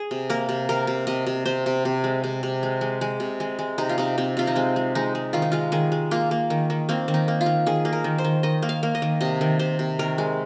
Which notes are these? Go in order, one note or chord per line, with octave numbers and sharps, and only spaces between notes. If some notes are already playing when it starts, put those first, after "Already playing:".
Already playing: G#4
C3
A#3 A#4
C3
C3 A#4
C3
C3 D#5
C3
C3 C5
C3
C3
G#3
C3
C3
G#3
G#3
G#3
C3
G#3
G#3
C3 D#4
F4
C3 D#4
C3 C4
C3 F4
D#4
G#3 C4
G#3
G#3 D#4
G#3
D#3 F4
D#4
G#3 F4
D#3 G#4
G#3
A#3 F4
A#3
D#3
D#3
A#3 C4
D#3
D#4
A#3
F4
D#3
D#3 G#4
A#3
A#4
D#3
C5
D#3
D#3 D#5
A#3
F5
A#3
D#5
D#3
C3 D#5
D#3
C3 C5
C3
D#3 A#4
G#3